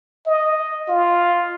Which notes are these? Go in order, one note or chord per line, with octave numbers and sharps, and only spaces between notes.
D#5
F4